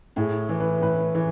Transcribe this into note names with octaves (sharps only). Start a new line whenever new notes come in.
A2 G#4
E3
B4
A2 B4
E3